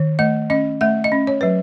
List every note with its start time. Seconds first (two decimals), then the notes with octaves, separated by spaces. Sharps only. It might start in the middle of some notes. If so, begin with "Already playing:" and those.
Already playing: D#3
0.19 A3 D#5
0.50 C#4 D#5
0.81 A3 E5
1.04 D#5
1.12 C#4
1.27 C#5
1.41 F#3 B4